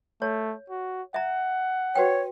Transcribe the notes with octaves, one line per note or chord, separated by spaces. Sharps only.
A3 C#5
F#4
E5 F#5 A#5
F#4 B4 C#5 G5